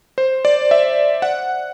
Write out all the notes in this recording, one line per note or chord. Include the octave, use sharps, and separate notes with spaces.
C5
D5
E5
F#5